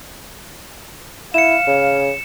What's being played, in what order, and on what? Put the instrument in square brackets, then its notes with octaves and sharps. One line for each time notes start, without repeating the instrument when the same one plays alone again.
[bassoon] E4 [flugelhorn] F5 [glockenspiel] C#7 E7
[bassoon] C#3